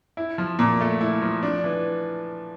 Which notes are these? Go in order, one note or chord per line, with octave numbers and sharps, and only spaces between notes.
E4
F3
A#2
A3
E4
F3
D4
E3